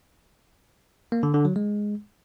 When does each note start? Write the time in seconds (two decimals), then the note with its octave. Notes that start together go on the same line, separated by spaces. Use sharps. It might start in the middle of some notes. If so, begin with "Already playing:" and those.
1.12 A#3
1.23 D3
1.34 D3
1.45 F#3
1.56 G#3